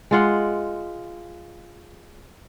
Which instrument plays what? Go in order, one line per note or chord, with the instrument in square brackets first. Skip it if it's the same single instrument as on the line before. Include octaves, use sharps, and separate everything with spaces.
[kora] G#3 F4 F#5